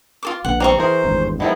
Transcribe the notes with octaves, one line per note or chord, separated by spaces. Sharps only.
F4 A4 D6
A#1 D3 B3 F#5
G3 C4 A#5 C#6
E3 G#4 A#4 C5
G#1 E2 G2
D#3 F3 G#3 B3 E4 A#4